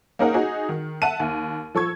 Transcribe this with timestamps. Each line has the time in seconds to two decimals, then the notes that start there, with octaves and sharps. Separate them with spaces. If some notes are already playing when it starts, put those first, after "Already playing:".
0.19 A#3 C#4 D#4 G#4 A#4 F#5
0.34 D#4 F#4 G#4
0.69 D#3
1.02 E5 F#5 A5 D#7
1.20 D#2
1.74 F3 A4 C#6 G#6